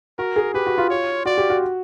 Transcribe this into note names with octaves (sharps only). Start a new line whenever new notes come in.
F#4 A#4
G#4
G4 B4
F#4
F4
C#5
F#4 D5
G4
F#4